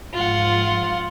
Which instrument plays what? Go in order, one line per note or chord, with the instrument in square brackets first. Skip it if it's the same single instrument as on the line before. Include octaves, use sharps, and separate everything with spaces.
[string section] G#2 F3 F5 [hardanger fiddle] F4 F#5